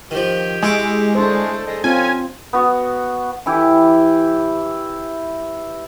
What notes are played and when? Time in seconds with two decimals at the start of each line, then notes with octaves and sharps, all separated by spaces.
0.11 D#3 F3 G4
0.63 G#3 E4 C#6 D6
1.15 A3 D4 A4 C5
1.66 G#3 A4 D#5
1.84 C4 C#4 F4 A4 G#5
2.53 B3 F#4
3.46 E3 E4 G4